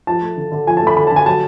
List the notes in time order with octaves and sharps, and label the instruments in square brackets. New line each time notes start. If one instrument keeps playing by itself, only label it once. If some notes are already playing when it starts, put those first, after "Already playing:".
[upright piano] F3 A5
A3
D3
D3
F3 G#5
A5
A3 B5
D3 B5
A5
D3 G#5
F#3 A5